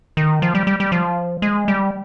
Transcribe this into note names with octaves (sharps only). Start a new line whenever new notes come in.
D#3
F3
G3
G3
G3
F3
G#3
G3